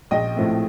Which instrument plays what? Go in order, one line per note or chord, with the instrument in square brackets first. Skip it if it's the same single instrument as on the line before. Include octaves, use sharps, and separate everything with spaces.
[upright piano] A#1 D#5 G5
A2 F3 A3 C4